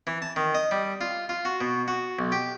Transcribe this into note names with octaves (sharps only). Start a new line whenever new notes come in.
E3
A5
D#3
D#5
G3
F4
F4
F#4
B2
F#4
B1
G4